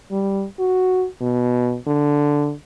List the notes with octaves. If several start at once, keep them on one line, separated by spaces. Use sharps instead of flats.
G3
F#4
B2
D3